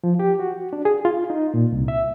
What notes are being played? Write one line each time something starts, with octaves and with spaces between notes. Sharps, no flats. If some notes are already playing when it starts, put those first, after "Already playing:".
F3
G4
F#4
D4
G#4
F4
D#4
A#2
C2
E5